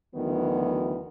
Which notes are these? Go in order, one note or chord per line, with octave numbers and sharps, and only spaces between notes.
D2 D#3 E3 F#3 B3